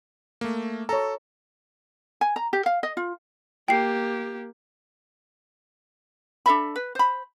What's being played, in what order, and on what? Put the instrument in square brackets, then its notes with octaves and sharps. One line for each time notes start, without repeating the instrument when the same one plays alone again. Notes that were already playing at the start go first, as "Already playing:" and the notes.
[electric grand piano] A3 A#3
[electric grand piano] A4 [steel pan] C#5 A#5
[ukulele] G#5
A#5
G4
F5
D#5
F4
[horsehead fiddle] A#3 G4 [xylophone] G5 C7
[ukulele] D4 A4 E5 B5
B4
C5 B5